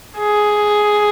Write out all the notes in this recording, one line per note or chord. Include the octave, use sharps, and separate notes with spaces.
G#4